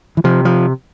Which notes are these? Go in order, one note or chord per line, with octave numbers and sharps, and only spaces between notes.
E3
C3 F3
F3